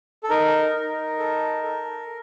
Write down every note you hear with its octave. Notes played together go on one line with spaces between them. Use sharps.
A4
D#4 A#4
D#4
A4
A4